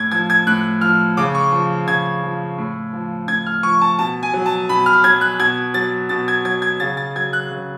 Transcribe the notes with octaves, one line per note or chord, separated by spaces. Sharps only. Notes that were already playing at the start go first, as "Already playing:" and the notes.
Already playing: A2 G#6
F3 G#6
G#6
A2 F#6
F3 F6
C#3 D6
C#6
F3
C#3 G#6
F3
A2
F3
A2 G#6
F6
F3 C#6
A5
B2 A5
G#5
F#3
A5
B2 B5
F6
F#3 G#6
F#6
B2 G#6
F#3 A6
B2 A6
G#6
F#3 G#6
G#6
C#3 A6
A6
F#3 G#6
F#6
C#3